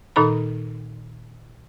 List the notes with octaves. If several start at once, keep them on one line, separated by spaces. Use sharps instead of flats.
A#2 D#3 D#4 A4 A#5 B5